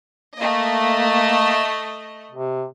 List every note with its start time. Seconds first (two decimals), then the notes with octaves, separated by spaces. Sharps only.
0.36 A3 A#3 D#5
2.31 C3